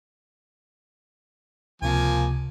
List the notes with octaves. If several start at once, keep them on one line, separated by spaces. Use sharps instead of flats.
C#2 C3 F3 A#3 G#5